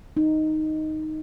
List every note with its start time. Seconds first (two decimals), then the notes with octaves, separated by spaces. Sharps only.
0.17 D#4